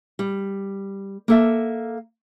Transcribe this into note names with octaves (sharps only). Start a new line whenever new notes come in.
G3
A#3 A4 E5